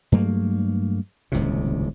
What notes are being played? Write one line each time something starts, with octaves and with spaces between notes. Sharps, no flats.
G2 F#3 A3 A#3
D#1 C#2 A2 C3